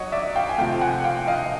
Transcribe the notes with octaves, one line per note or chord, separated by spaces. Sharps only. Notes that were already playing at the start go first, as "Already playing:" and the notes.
Already playing: F#3 C#5 D#5 F#5
D5 E5
F5 G5
G#5
C3 F3 A3 F5 G5
F#5 G#5
F5 G5
D#5 F5